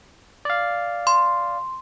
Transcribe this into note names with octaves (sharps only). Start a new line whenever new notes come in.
D5 F5
C6